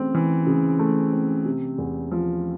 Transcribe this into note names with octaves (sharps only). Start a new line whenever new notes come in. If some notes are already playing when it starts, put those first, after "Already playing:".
Already playing: C#3 E3 A3 C4
E3
C#3
A3
C4
C3
E2
F3